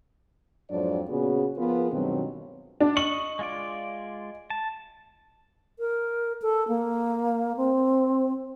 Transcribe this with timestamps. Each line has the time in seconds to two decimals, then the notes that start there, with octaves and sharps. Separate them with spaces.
0.70 F2 G#2 F#3 C4 D4 D5
1.10 A#2 C#3 B3 C#4 F#4 G#4
1.58 F3 B3 F4 G#4 A#4 B4
1.92 G2 B2 D#3 F#3 G#3 C4
2.81 D4
2.97 D#5 C#6 F#7
3.39 G#3 F4 D5
4.50 A5
5.79 A#4
6.42 A4
6.68 A#3
7.57 C4